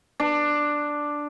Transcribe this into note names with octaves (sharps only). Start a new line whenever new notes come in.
D4